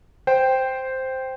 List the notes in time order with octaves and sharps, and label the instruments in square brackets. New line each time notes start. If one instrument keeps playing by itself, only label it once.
[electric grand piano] C5 G5